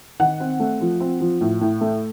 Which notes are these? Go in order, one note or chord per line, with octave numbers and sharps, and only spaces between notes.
D#3 F#5
C4
A3
F3
C4
F3
A2
A2
A3